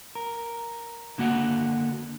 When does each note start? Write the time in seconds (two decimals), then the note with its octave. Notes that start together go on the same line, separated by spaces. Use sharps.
0.15 A#4
1.18 D3 A#3 F#4 F#5